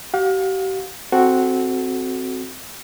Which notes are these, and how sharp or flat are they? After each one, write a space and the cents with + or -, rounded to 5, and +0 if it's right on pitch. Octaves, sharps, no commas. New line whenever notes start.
G4 -40 F5 +35
C4 +0 F#4 +0 A4 -20